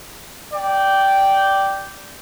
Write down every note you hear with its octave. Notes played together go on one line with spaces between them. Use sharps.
D5 G5